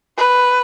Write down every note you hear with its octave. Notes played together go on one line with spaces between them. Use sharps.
B4